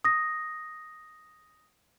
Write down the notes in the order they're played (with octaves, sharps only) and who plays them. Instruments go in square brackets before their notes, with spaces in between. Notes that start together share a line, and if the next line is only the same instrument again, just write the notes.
[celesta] D#6 A#6